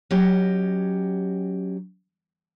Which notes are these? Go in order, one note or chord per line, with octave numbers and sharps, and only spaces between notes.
F#3 C#4 G4 D#5